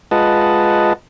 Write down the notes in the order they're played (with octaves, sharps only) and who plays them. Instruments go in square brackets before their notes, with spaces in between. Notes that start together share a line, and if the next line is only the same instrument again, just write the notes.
[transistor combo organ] G#3 F4 B4 D#5 F#5 A5